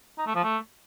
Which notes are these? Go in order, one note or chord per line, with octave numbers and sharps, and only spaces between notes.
D#4
A3
F3
A3